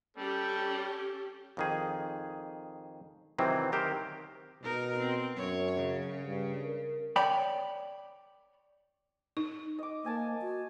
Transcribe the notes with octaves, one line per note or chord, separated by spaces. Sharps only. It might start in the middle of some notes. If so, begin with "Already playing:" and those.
G3 C#4 G4 A4
F2 D#3 G#4
C3 D#3 E3 F#3 C4
D#3 G4 A#4 C5
B2 D#4 A#4
C4
F#2 C#5
C#3
G2
A#4
C#5 D5 G5 B5
D#4
D#5 D6
A#3 D#5 G#5 A5
F#4